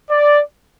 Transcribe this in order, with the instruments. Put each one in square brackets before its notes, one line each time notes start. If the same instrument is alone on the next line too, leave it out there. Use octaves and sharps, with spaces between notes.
[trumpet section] D5